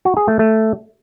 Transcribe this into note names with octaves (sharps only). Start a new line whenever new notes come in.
F#4
G#4
A3
A3